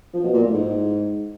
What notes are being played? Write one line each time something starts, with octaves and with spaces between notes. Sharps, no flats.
F3
B2
A#2
A2
G#2